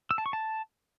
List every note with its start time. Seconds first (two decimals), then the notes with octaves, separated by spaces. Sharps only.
0.11 E6
0.18 A5
0.26 C#6
0.33 A5